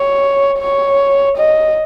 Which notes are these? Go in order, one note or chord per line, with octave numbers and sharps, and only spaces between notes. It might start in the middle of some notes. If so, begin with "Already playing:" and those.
Already playing: C#5
C#5
D#5